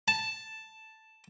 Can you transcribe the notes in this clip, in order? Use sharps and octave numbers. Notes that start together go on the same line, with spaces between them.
A5